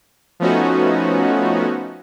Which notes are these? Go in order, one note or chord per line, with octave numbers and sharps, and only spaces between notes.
F3 A3 B3 C#4 D#4 F#4